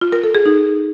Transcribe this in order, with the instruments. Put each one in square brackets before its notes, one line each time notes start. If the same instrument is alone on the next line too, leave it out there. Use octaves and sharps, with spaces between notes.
[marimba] F4
A#4
A4
G#4
D#4